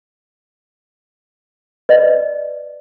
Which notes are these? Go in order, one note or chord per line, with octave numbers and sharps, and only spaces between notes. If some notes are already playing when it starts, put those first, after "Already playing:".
B4 D5 D#5